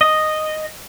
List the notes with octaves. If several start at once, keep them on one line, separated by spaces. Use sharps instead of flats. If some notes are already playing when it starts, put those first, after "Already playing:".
D#5